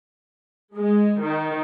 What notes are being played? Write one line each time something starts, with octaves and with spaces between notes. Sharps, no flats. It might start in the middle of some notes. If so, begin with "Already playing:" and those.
G#3
D#3